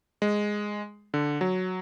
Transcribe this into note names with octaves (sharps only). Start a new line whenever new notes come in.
G#3
D3
F#3